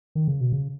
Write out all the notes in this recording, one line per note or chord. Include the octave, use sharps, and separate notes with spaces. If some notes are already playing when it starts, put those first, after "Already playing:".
D#3
C#3
B2
C#3